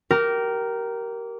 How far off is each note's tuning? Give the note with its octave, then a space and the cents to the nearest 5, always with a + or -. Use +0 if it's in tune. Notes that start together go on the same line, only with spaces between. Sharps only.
G4 -25 A#4 +0